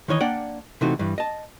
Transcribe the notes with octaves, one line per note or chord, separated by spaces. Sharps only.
D#3 E3 C#5 D#5
A#3 D4 D5 F#5 G5
C3 E3 A3 D#4 F#4
G2 E3
D#5 A5